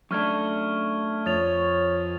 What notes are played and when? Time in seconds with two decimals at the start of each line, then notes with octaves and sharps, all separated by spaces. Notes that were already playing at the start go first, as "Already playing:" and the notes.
0.11 F#2 A3 D4 C#6 F6 G#6
1.26 F2 C#5 D#6 A6 F7